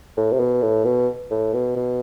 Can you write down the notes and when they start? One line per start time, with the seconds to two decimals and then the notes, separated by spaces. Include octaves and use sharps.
0.17 A2
0.32 C3
0.40 B2
0.62 A2
0.85 B2
1.31 A2
1.54 B2
1.76 B2